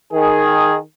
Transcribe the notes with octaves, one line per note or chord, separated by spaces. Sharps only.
D#3 G#4